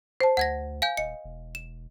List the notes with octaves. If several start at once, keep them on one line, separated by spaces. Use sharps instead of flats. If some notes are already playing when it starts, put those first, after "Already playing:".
C5 A5
D2 F#5 G#6 A#6
F5 G#5 G6
D#1 D#5 C#7
E1
E7